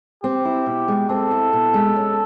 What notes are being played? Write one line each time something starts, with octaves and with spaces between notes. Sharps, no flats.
C4 G4
E4
B2
G#3
C4 A4
E4
B2
G#3
C#4